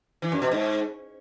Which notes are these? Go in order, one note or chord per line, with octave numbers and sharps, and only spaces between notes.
E3
F#2
B2
G#2